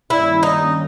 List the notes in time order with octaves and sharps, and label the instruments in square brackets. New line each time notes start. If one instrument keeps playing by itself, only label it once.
[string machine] G2 D#3 G3 A#3 C#4 [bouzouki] E4
[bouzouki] D#4